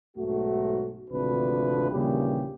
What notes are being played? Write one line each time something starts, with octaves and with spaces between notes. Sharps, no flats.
B1 G#2 A3 F#4
G#1 D2 C3 F3 D4 B4
A#1 D#2 C#3 E3 G3 G4